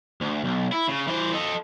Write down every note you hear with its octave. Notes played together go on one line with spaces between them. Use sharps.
D2
B1
E4
C#3
E3 C5
A4 D#5